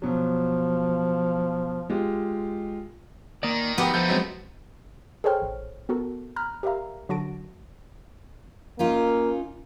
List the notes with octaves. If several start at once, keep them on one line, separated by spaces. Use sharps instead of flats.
B2 F3 F#3
G#3 F4 G4
D#3 A#3 D5
F3 B3 F#4 G4 G5 D6 E6
F3 A3 D#4 C5 G6
F#3 G#3 C4
G#4 A4 C5 C#5 G5 F6
A1
B3 F#4 A4 A#4
A#5 B5 F6 F#6
G4 A#4 D5 E5 F5 A#5
D3 F#3 F#4 A5 A#6 D7
A#3 C#4 D#4 F4